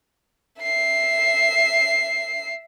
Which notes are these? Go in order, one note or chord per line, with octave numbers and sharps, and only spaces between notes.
E5 C7